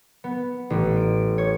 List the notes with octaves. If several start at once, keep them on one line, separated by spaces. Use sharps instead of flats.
B3
A1
D7
C#5